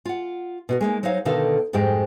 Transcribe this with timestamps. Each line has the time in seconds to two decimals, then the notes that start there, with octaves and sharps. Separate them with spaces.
0.05 F4 F#5
0.69 B2 F#4 A#4
0.81 G#3 A#3 D#4
1.03 F#3 D#4 C5 C#5 F5
1.25 B2 D3 D#3 D#4 A4 F5
1.73 F2 G#2 G#3 G4 G5